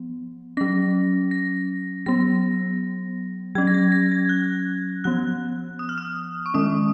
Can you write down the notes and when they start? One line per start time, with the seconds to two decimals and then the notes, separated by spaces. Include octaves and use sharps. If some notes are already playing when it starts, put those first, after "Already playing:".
Already playing: F3 B3
0.57 F#3 C#4 A#6
1.31 A#6
2.06 F#3 B3 A#6
3.55 F#3 G#6
3.58 C#4
3.67 A#6
3.74 G#6
3.92 A#6
4.12 G#6
4.29 F#6
5.04 F3 B3 F#6
5.79 D#6
5.89 F6
5.98 D#6
6.46 C#6
6.54 D#3 G#3 C#4 D#6